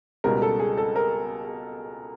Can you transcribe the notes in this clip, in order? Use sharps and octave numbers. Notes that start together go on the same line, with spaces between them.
C#2 B2 G3 A#4
A4
G#4
A4
A#4